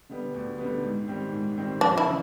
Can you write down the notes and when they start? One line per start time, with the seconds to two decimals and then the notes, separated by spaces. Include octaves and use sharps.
0.09 D3 G3 B3
0.34 D2
0.59 D3 G3 B3
0.83 G#2
1.08 D#3 G3 C4
1.32 G#2
1.57 D#3 G3 C4
1.81 F2 D4
1.97 E4
2.06 C#3 E3